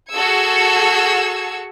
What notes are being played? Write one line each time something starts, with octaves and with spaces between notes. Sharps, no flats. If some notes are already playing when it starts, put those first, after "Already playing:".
F#4 G#4 A4 E6 G#6 C#7